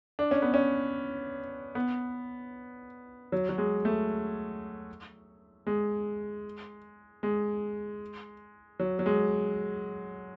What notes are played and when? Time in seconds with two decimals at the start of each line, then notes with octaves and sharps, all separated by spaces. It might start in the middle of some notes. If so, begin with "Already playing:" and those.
0.19 D4
0.31 C#4
0.42 B3
0.54 C#4
1.75 B3
3.32 F#3
3.49 F#3
3.58 G#3
3.85 A3
5.67 G#3
7.23 G#3
8.79 F#3
8.99 F#3
9.06 G#3